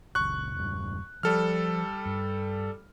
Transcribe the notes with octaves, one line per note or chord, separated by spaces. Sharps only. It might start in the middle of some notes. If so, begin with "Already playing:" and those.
F#1 C#2 C#6 F#6
E1 G2
F3 G3 A4 F6
G2